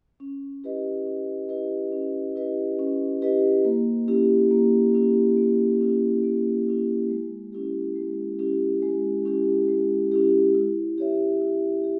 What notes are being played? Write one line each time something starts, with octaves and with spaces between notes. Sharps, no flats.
C#4
E4 G4 B4 D#5
C#4
E4 G4 B4 D#5
C#4
E4 G4 B4 D#5
C#4
E4 G4 B4 D#5
A#3
C#4 E4 G4
A#3
C#4 E4 G4
A#3
C#4 E4 G4
A#3
C#4 E4 G4
G#3
C#4 E4 G4
G#3
C#4 E4 G4
G#3
C#4 E4 G4
G#3
C#4 E4 G4
E4
G4 C#5 E5
E4
G4